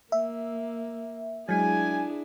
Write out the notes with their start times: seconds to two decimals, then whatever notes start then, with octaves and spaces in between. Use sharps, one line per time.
0.12 A#3 E5
1.49 F#3 G#3 D4 E4 G#4 G#5